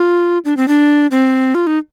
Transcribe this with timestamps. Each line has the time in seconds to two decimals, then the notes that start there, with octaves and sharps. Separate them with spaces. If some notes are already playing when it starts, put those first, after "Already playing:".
Already playing: F4
0.45 D4
0.57 C4
0.68 D4
1.11 C4
1.55 F4
1.67 D#4